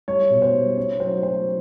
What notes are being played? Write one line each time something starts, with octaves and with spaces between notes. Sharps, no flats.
G3 C#5
B2
C5
G3
C#4 C#5
F#3 C5
F#3 C5